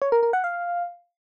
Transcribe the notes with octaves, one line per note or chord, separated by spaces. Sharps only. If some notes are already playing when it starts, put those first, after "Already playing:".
C#5
A#4
A#4
F#5
F5